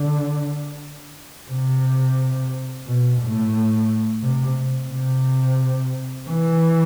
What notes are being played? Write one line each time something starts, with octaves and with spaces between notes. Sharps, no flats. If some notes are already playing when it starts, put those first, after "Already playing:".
Already playing: D3
C3
B2
A2
C3
C3
E3